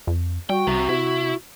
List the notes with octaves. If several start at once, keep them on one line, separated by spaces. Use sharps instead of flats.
F2
G3 F#4 G5
C2 C3
C3 E4